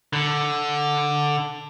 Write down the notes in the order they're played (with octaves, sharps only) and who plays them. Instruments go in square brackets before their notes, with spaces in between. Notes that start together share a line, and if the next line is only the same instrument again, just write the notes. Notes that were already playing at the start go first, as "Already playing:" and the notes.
[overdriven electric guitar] D3